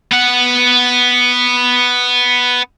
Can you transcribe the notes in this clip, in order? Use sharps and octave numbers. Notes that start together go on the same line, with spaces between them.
B3 F#5